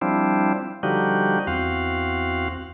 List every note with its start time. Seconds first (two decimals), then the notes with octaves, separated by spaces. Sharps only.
0.01 F3 G3 C4 D4 E4
0.83 D3 F3 G3 D#4 F#4 G4
1.47 E2 C4 F#4 F5